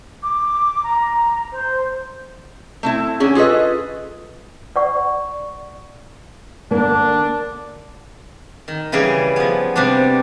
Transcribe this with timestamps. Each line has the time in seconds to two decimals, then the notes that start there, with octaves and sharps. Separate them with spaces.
0.23 D6
0.83 A#5
1.52 C5
2.83 A3 C4 E4
3.20 D3 C#4 G#4
3.35 F4 G#4 A4 B4 D#5
4.76 D5 F#5 C#6
6.71 D3 A#3 D4
8.68 D#3
8.92 C#3 E3 G3 G#4
9.36 F3 B3
9.76 C3 G3 B3 D4